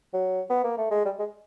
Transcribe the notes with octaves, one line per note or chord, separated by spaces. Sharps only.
F#3
B3
A#3
A3
G#3
G3
G#3